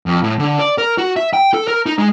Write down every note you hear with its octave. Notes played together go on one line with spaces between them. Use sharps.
F2
A2
D3
D5
A#4
F#4
E5
G5
A4
A#4
D#4
G#3